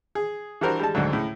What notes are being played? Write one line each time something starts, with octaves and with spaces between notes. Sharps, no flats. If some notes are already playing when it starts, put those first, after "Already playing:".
G#4
E3 G3 D4 F#4 A#4 C5
G3 G#3 A5
D2 G#2 D3 F#3
A2 C#3